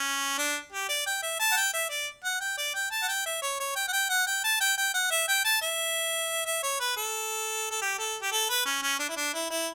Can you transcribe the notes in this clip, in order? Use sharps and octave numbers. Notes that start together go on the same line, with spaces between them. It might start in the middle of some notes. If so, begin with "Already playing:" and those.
Already playing: C#4
D4
G4
D5
G5
E5
A5
F#5
G5
E5
D5
F#5
G5
D5
G5
A5
F#5
G5
E5
C#5
C#5
G5
F#5
G5
F#5
G5
A5
G5
G5
F#5
E5
G5
A5
E5
E5
C#5
B4
A4
A4
G4
A4
G4
A4
B4
C#4
C#4
D4
E4
D4
E4
E4